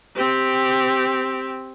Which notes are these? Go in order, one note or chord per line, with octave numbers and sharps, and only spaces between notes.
C4 G4